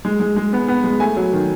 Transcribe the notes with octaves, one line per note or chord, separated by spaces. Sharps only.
G#3
G#3
G#3
B3
B3
G#3
A3 G#5
F#3
D#3